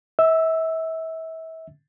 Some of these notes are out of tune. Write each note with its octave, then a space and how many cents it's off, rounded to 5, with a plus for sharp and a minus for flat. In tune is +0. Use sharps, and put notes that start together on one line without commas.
E5 -35 E6 +0